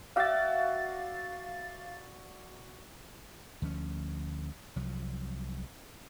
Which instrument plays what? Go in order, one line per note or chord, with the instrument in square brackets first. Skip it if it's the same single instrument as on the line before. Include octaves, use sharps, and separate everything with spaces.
[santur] F#4 D5 E5 [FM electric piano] F5 A6
[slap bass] D2 F3 G#3 C#4
C2 F3 F#3